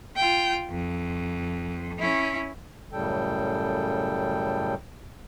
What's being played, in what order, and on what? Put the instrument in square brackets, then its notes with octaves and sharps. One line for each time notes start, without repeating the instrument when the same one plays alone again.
[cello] F4 G5
F2
C#4 E4
[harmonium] F#2 A2 C#3 G3 A4 G5